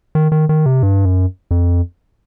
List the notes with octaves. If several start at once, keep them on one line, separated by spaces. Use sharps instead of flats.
D#3
D#3
D#3
C3
G2
F#2
F2